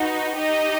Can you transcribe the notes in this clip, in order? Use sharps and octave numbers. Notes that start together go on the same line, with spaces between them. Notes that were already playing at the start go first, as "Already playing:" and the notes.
Already playing: D#4 F#4 B4
D#4 G4 D#5